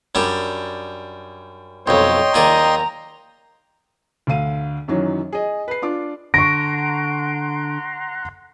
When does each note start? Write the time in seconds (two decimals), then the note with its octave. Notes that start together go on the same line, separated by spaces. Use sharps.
0.15 F#2 G3 D4
1.87 B1 F2 C#5 D#5 G5 C6
2.34 D#2 G#4 D5 A#5
4.27 D2 D3 F5 D#7
4.88 F#2 D#3 E3 F#3
5.33 G#4 D#5
5.68 B4 C7
5.82 D4 F4 D6
6.34 D3 F#5 A#5 C6 C#6 A#6 D7